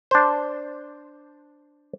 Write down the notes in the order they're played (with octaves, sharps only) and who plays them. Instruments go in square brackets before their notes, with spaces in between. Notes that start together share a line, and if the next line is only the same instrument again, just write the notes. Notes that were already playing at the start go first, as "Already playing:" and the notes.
[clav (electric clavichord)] D4 C5